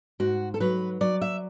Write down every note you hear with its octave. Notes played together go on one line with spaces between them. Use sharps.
G#2 F#4
A4
F#3 B4
F#3 D5
E5